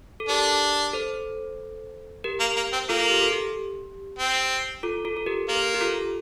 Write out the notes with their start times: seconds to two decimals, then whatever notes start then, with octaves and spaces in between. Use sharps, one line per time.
0.20 A4
0.29 D4 G4 A#4
0.93 A4 C5
2.24 G4 A#4
2.40 A#3
2.56 A#3
2.73 C4
2.89 A#3 F4 A4
3.10 G4
3.22 A4
3.32 G4
4.19 C4
4.83 F4 A4
5.05 F4 A4
5.17 A4
5.26 G4 A#4
5.49 A#3 G4 A#4
5.74 G4
5.81 F4 A4